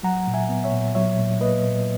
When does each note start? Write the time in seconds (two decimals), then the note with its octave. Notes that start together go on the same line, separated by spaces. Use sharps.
0.03 F#3 F#5 A#5
0.27 A#2
0.34 E5 G#5
0.49 B3
0.64 C#5 E5
0.72 A#2
0.95 F#3 C#5 E5
1.18 A#2
1.40 A#3 B4 D#5
1.64 A#2